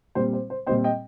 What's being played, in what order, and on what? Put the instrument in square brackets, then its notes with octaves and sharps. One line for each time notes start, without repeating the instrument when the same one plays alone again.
[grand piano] A#2 G3 C4 C5
C5
C5
A#2 G3 C4 C5 D#5
D#5 G5